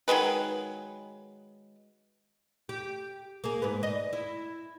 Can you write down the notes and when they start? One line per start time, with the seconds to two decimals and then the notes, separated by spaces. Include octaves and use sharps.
0.08 D#3 F#3 G#3 B4
2.69 G4
3.44 A#3 G#4
3.62 G#2 B4
3.83 D#5
4.13 E4